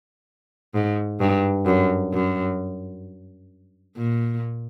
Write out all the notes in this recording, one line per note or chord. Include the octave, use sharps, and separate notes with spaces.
G#2
G2
F#2
F#2
A#2